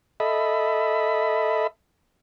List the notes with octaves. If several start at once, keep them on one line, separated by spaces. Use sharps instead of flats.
A4 D#5 E5 B5